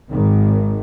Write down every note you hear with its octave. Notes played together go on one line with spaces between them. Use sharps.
G#1 D#3